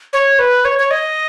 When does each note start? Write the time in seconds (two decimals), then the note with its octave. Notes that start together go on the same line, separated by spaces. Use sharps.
0.13 C#5
0.39 B4
0.65 C#5
0.79 C#5
0.91 D#5